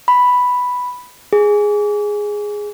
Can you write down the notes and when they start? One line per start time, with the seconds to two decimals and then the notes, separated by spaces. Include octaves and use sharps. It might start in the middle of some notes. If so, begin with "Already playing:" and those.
0.08 B5
1.33 G#4